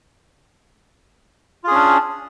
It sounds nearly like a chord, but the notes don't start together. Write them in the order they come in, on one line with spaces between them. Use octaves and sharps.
F4 G#4 C#4 D4